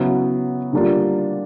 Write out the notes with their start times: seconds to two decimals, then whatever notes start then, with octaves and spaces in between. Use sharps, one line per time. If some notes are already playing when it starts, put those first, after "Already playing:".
Already playing: C#3 F#3 B3 E4
0.73 D3 G3 A#3 D4 F4